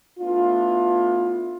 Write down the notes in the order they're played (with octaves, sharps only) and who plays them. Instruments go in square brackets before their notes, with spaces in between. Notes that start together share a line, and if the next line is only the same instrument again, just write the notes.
[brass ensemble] A3 B3 D4 E4 F4